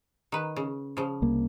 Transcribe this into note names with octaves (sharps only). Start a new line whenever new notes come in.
D#3 B4
C#3
C#3 F3
C2 A#3